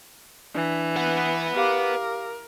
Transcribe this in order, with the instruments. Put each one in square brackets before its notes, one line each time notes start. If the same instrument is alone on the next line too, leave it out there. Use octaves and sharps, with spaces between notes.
[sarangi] E3 [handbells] D4
[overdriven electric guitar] B4 F#5
[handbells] G4 F5 D6 [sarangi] A#4